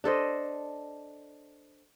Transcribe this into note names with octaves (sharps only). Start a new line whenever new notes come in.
D4 A4 C5 D#5